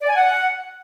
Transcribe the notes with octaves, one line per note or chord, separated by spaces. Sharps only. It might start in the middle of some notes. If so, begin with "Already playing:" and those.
D5
G#5
F#5